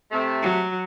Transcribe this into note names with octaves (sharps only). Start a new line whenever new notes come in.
C3 A3
F#3